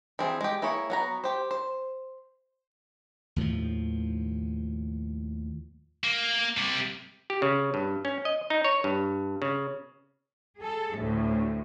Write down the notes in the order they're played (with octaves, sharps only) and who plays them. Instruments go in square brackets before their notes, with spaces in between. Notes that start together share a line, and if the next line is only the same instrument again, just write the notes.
[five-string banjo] E3 F3 C4 G#4
G#3 G4
A#3 E4 G#4 C#5
F#3 B3 A#5
G4 C5
C5
[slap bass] D#2 A2 D#3 F3
[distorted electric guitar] A#3
C3 G3
[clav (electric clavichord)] G4
C#3
G2
C#4
D#5
D#4
C#5
G2
C#3
[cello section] G#4 A4
D2 A2